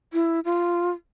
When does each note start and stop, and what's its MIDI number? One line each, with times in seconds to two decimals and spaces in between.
0.13 0.40 64
0.45 0.90 65